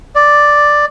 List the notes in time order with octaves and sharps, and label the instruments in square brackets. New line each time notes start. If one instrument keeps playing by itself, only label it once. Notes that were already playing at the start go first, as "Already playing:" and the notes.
[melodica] D5